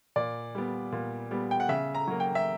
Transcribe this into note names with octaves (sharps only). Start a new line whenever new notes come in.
A#2 D5
G3 B3
A#2
G3 B3
G5
F#5
C#3 E5
A#5
F#3 A#3
G5
E5